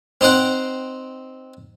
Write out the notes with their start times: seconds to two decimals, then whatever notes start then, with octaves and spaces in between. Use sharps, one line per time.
0.21 C4 D#4 C5 F#5 G5